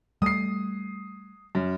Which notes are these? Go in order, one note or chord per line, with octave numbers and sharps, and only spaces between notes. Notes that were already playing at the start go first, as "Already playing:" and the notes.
G3 A3 D#6 C7
F#2